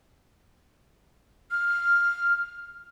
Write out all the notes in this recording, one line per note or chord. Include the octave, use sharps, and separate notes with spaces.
F6